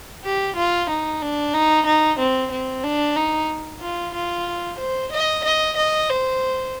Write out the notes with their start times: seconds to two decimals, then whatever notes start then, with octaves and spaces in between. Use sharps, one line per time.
0.24 G4
0.56 F4
0.89 D#4
1.22 D4
1.54 D#4
1.86 D#4
2.19 C4
2.51 C4
2.84 D4
3.16 D#4
3.81 F4
4.14 F4
4.78 C5
5.12 D#5
5.44 D#5
5.77 D#5
6.09 C5